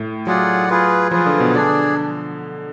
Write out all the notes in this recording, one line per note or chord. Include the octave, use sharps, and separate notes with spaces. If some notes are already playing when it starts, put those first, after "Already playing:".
Already playing: A2
F#3 F4 G#4 D5 F#5
F4 G#4 B4
F3 F4 G#4 B4
D3
B2
D3 D4 G#4 D5